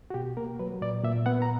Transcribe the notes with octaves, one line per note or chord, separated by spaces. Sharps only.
F#4
B2 G4
A#3 A#4
F#3 B4
A#2 D5
A#2 E5
B3 F#5
A#5